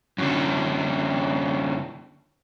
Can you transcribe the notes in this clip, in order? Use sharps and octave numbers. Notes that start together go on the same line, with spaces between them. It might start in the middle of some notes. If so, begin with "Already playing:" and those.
F#2 D3